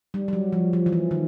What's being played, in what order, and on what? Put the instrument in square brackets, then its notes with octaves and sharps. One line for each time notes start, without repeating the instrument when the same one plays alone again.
[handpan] G3
G3
F#3
F3
F3
E3
F3
D#3